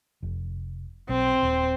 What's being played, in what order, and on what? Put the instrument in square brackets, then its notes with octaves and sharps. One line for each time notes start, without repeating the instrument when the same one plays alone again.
[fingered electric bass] F1
[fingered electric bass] B1 [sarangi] C4
[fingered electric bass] D#1